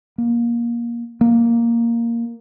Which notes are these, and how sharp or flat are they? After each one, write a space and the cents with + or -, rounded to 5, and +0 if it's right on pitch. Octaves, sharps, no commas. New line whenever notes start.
A#3 +20
A#3 +0